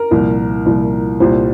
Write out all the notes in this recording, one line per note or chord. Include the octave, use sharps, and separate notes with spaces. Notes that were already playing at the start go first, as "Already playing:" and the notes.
Already playing: A#4
C2 A#2 F3
C2 A#2 F3
C2 A#2 G3 C5